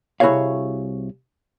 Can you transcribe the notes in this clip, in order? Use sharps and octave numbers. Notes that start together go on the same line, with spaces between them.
C2 E4 F#4 G#4 C#5 F5